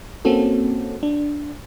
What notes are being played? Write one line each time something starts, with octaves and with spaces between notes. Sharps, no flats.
A#3 C4 C#4 F#4 A4
D4